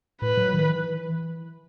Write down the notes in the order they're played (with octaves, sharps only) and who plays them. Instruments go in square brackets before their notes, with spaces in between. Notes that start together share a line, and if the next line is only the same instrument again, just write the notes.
[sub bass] A2 [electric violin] B4
[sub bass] F#3
D#3
E3